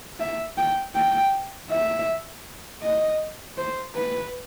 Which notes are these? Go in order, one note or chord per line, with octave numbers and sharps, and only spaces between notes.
E5
G5
G5
E5
D#5
C5
B4